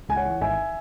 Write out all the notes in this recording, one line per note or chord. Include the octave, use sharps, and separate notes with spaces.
C#2 G#5
C#5 F#5
E3
G#1 E5 G#5